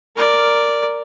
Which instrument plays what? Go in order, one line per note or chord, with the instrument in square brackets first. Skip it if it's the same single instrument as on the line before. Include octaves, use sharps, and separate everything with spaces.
[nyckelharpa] A#4 D5